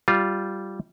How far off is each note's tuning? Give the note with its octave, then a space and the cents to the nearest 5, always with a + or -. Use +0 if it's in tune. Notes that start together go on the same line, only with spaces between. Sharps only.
G3 -10 F4 +0